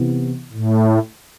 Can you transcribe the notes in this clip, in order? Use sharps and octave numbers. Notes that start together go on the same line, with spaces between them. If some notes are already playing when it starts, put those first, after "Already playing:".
Already playing: C3 E3 B3
A2